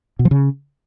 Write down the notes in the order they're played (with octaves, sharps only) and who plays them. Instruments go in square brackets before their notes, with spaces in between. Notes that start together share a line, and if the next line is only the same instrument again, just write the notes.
[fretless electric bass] B2
F3
C#3